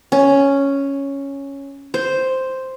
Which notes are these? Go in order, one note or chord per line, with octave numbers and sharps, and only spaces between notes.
C#4
C5